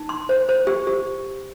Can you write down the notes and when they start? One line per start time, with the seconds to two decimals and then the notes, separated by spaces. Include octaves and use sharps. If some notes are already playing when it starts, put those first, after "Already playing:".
Already playing: D#4
0.09 C6
0.29 C5
0.49 C5
0.67 G4
0.87 G4